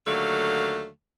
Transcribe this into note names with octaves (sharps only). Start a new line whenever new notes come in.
D#2 D3 F#3 A3 F5